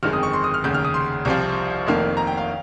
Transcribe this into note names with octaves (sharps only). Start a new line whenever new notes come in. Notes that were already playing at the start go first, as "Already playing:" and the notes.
G1 F2 D#3 G#3 C4 F6
D#6
C#6
C6
D#6
F6
F1 D#2 C#3 G6
F6
D#6
C6
C2 C3 F3 C4 F4
F1 F2 D#3 A#3
A#5
G5
F5